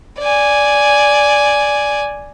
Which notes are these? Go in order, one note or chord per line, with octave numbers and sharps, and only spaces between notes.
D5 G#5